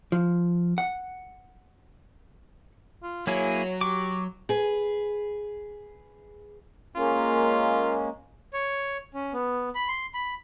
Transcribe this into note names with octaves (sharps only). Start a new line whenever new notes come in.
F3
F#5
F4
F#3 A#3 E4 G#4 C#5
G4 C#6 D6
G#4 B4
G#3 A#3 C#4 F4
C#5
C#4
B3
B5
C6
B5